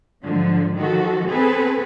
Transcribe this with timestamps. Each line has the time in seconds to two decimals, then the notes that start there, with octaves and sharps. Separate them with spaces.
0.24 G#2 D3 F3 F#3
0.75 D#3 F3 F#4 A4
1.27 C4 G#4 A4 B4